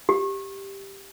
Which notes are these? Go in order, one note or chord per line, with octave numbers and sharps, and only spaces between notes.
G4